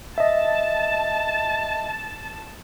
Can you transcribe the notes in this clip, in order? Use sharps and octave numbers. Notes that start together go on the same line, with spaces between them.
D#5 E5 A5